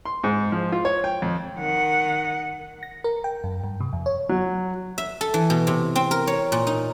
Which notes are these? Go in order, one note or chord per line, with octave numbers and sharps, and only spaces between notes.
C6
G#2
F3
F4
C#5
G5
F2
D#3 F#5
A#6
A#4
G5
F#2
G2
C3
F2
C#5
F#3
E5
A4
E3
B2
C3
C4
A#4
C#5
A#2
D#4